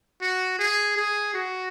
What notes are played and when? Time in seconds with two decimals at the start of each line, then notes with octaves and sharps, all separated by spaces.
0.21 F#4
0.59 G#4
0.96 G#4
1.34 F#4